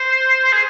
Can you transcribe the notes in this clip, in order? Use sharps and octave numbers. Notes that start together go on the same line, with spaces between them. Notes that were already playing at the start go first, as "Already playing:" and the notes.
Already playing: C5
C5
G#4